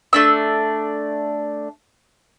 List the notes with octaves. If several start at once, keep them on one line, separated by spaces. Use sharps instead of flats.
A3 D4 E6